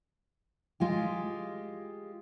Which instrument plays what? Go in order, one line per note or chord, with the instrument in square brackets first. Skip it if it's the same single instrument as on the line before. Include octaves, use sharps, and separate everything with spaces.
[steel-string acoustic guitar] G#3 F4 G4